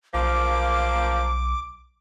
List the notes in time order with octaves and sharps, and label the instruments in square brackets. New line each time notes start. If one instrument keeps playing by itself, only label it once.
[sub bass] B1 [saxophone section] F3 A#3 [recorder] D6